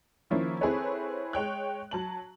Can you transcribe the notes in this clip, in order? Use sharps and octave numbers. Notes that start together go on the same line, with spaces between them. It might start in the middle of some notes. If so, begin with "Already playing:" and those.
D#3 F3 A#3 C#4 E4
C4 E4 G#4 A4 B4 C#5
G#3 C#5 G5 F#6
F#3 A5 F#7